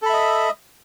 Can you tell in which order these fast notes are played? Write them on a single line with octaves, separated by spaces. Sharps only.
A4 B5 E5 D#5